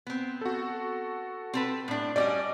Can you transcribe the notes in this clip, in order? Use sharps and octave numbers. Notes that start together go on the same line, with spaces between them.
B3 C4
F#4 A4
C4 A4 B4
A2 D4
G3 C#4 F#4 D5 D#5 D6